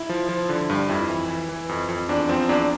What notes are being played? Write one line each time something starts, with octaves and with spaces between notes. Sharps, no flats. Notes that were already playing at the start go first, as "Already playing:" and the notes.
Already playing: E4
F3
F3
D3
G2
F2 E4
E3
E3
E3
F2
F2
E2 D4
F3 C4
E2 D4